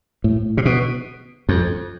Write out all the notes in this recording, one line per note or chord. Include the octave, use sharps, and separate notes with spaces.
A2
C3
B2
F2